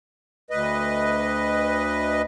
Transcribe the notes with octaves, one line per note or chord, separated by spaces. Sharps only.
D2 B4 D#5